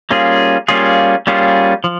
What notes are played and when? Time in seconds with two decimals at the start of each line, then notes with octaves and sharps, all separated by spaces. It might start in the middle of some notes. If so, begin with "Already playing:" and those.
0.11 G3 A#3 C#4 F4 G#4
0.68 G3 A#3 C#4 F4 G#4
1.27 G3 A#3 C#4 F4 G#4
1.84 F3